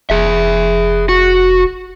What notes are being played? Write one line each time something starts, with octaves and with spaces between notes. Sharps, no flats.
F1 G#4 E5
F#4